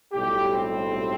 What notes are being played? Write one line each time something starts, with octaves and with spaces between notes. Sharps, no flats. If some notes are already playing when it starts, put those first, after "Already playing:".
B1 A2 G3 G4
C4